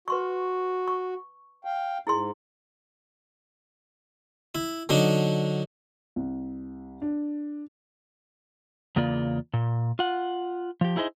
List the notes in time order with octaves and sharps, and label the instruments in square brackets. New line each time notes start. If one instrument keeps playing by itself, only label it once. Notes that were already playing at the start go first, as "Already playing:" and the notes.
[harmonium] F#4 [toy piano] B4 C6 C#6
[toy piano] C#6
[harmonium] F5 G5
[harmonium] G#2 [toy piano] E4 G#4 C6
[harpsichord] E4
D3 F#3 D4 D#4
[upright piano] C2
D4
[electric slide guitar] E2 C#3 A#3 F4 D5
A#2
F4 F#5
F3 G4
D#4 E4 G#4 C5 D#5